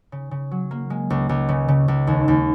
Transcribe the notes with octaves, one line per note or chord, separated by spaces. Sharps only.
C#3
C#3
F#3
A#3
G#3
C#2
C#2
C#3
C#3
C#2
D#2
D#2